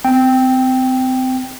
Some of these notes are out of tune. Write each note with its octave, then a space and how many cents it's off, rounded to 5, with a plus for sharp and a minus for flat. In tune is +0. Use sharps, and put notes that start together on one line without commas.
C4 -30 G5 +0